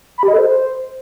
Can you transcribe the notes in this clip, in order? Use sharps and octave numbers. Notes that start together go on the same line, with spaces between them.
B5
G4
D#5
A4
C5